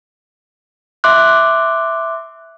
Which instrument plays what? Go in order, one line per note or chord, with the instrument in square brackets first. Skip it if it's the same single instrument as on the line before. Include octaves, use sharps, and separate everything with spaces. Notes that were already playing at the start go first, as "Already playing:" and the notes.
[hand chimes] E5 C6 D6 F#6